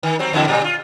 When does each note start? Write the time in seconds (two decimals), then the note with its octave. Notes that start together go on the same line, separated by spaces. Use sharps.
0.03 D#3
0.19 F#3 G3 C4
0.33 E2 D3 E4
0.47 A#2 G3
0.64 F4